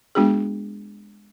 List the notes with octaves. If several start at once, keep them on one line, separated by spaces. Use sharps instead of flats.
G#3 B3 D4 F#4 G#4